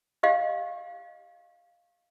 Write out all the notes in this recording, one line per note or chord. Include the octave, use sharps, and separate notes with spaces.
G4 D#5 F5